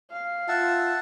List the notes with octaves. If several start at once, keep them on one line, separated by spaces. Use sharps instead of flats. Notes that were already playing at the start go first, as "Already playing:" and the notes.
F5
F4 E5 F#5 A5